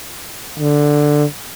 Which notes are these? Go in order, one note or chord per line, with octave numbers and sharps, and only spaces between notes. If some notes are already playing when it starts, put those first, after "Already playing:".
D3